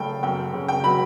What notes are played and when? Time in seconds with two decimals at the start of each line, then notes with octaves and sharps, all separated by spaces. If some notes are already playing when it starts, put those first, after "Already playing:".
Already playing: C#3 F#3 A3 G5 A5 B5
0.23 F#2 G5
0.54 C#3
0.68 G5
0.84 F#3 B5